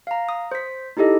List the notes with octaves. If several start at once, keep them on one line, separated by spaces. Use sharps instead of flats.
F5 A#5
D#6
C5 B6
D#4 E4 G4 A4 D#5